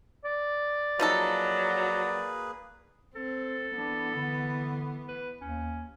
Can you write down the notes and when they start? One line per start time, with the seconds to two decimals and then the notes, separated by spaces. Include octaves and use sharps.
0.25 D5
0.99 F3 F#3 A#3 D#4 G#4 A4 B4
3.15 C4 A4
3.75 E3 B3 D4
4.15 D3
5.08 B4
5.41 D#2 C#4